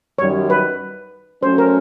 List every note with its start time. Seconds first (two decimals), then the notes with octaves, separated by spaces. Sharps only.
0.18 F#2 D#3 G3 C#5
0.50 B4
1.43 F#3 A3 C#4 C5
1.58 A#4